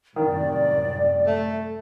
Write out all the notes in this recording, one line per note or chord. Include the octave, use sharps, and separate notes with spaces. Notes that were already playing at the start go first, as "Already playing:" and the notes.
C2 F#2 A2 D#3 D5
A3